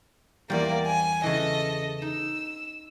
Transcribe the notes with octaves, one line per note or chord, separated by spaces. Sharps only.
E2 G3 A#3 D5
G#5
C#3 E3 A4 D#5
D#4 E6